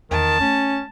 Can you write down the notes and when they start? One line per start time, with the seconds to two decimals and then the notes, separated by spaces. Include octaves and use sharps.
0.11 E2 D#3 A5
0.40 A3 C#4